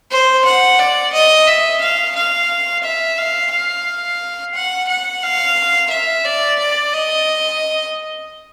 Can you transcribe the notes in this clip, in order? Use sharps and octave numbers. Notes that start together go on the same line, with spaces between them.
C5
F#5
D5
D#5
E5
F5
F5
E5
F5
F5
F#5
F#5
F5
E5
D5
D5
D#5